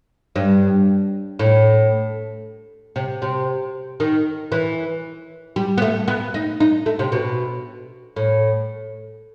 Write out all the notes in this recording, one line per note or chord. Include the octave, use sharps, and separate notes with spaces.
G2
A2
C3
C3
D#3
E3
G3
B3
A3
B3
D#4
D#4
A3
C3
B2
A2